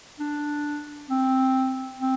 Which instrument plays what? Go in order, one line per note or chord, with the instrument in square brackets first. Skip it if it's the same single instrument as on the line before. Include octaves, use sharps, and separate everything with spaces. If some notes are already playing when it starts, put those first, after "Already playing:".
[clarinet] D4
C4
C4